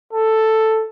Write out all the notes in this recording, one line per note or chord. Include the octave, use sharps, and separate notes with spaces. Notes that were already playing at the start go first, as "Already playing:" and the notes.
A4